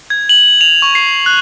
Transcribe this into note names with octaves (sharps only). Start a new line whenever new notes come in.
G#6
F#7
F7
C#6
C7
F#6